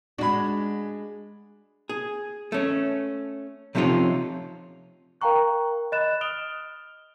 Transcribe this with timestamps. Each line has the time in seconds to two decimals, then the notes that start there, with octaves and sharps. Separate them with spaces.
0.18 G#3 D4 F#4 B5
1.89 G#4
2.52 A3 C#4
3.75 C3 F3 A3 C#4 D#4 F4
5.21 A#4 F5 G5 A#5 C#6 F#6
5.92 D#5 B5 F#6 A6 E7
6.21 D#6 F6 D7 F7 G7